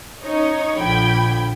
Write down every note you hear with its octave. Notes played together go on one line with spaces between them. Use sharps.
C#4 D#4 C#5 D#5
A#1 D3 F3 G5 B5 G#6